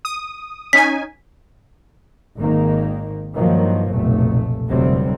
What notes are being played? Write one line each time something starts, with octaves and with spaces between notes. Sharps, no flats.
D#6
C#4 D#4 G#5 B6
G#1 G#2 D#3 A#3
G2 D#3 F3 F#3 A#3
F1 B1 A#2 A3
F1 D2 C3 F#3 G3 C4